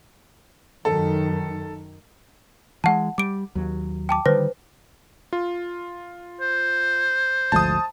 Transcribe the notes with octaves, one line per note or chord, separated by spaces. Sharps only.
F#2 D#3 A4
E3 G#3 F#5 A5
G3 D6 D7
D#2 F#3
G5 A5 D6
D3 D#3 G3 B4 C5 A#6
F4
C5
G#1 D2 F3 A5 D#6